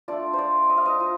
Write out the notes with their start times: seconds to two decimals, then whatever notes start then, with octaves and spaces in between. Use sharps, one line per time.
0.08 A3 D4 F4 D5
0.33 C5
0.38 D5
0.69 D#5
0.77 F5
0.86 D#5
1.00 F4